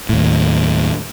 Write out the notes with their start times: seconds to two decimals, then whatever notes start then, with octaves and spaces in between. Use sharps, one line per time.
0.09 D#2 A2